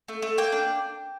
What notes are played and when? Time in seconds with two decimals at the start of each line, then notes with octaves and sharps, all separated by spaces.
0.08 A3
0.22 A3
0.38 A#3 G5
0.52 D4